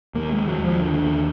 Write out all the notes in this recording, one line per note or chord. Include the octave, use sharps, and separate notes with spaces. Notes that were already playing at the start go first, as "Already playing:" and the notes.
D#2 A#3
G#3
D#2
F#3
D#2 F3
D#2 D3
D#2